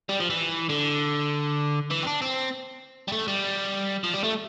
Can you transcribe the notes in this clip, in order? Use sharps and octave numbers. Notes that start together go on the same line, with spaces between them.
G3
F3
E3
D3
E3
C4
D4
C4
G3
A3
G3
F3
G3
A3